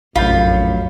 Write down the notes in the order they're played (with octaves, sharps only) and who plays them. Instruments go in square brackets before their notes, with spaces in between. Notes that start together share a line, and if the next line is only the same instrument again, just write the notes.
[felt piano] F1 G6 [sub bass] A#1 [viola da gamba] F#2 A2 [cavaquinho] F4 B5